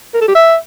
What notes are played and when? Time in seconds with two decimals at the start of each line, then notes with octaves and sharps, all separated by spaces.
0.14 A#4
0.21 A4
0.28 G4
0.35 E5